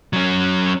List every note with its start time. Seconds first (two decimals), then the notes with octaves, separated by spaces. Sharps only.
0.13 F#3 C#4